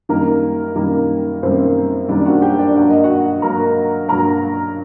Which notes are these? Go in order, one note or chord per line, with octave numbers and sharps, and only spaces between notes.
F#2 D#3 G3 A#3 A#4
F#2 D#3 G3 A#3
F#2 D#3 G3 A#3 C4 C5
F#2 D#3 G3 A#3 D4 D5
F#4 F#5
G4 G5
D4 D5
G2 F#3 A#3 F#5
D#5
F#4 F#5
G2 F#3 A#3 A#4 A#5
G2 F#3 A#3 A#4 A#5